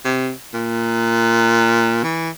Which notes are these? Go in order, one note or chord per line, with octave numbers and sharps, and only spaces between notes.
C3
A#2
E3